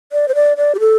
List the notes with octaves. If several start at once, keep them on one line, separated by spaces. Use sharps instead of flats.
D5
C5
D5
D5
G4
A4